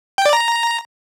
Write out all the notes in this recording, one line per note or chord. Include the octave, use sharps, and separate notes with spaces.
G5
D5
A#5